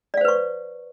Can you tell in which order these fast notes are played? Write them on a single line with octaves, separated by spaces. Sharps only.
D5 F5 C5 B4 C#6